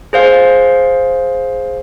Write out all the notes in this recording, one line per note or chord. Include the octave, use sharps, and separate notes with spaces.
G#4 C5 F5